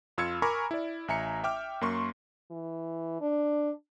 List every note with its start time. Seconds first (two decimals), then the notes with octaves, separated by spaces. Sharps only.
0.18 F2 F4 E6 F6 G#6 C#7
0.42 A#4 G#5 A#5 B5 C#6 D6
0.71 E4 D5
1.08 A1 E5 G#5 A#5 C#7
1.44 E5 G5 D6 F6
1.81 F#2 A#3 C6 C#6
2.51 E3
3.21 D4